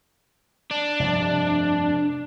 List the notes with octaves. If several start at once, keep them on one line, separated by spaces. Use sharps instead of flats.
D4
F1 G2